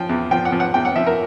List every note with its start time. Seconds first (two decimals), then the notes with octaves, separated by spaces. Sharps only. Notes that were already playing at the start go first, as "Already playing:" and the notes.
Already playing: F3 G5
0.09 E2
0.31 F3 G5
0.45 F#5
0.52 F3
0.60 F#5
0.74 E2 G5
0.85 F#5
0.96 F3 E5
1.06 A#4